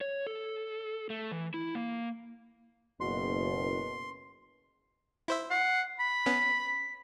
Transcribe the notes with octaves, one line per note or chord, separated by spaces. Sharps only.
C#5
A4
A3
E3
E4
A#3
F#1 B2 C6
E4 C5 E5
F#5 C7
B5 B6
B3 C#4